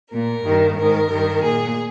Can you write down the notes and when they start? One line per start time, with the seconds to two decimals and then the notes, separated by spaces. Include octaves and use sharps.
0.11 A#2 A#4
0.43 G2 D#3
0.76 G#2 D#3 A#4
1.09 G2 D#3
1.42 A#2 G#4